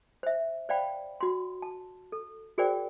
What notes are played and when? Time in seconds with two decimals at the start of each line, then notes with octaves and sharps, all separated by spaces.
0.23 C5 E5
0.69 C5 D5 F5 G5 B5
1.21 F#4 C6
1.62 A5
2.12 A4
2.58 F#4 G#4 A#4 C5 D5 G5